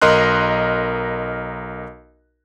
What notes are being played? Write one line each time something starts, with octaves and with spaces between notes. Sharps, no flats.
B1 A#4 D#5 C6 F#6